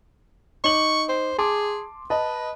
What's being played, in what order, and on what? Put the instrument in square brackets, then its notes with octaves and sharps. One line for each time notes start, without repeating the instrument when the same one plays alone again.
[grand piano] D#4 D6 F#7 [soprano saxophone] C#6
[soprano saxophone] C5
[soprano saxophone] G#4 [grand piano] A5 C6 D6
[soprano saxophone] B4 [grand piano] D#5 A5